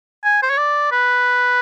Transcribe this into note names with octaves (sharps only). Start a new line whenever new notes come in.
G#5
C5
C#5
D5
B4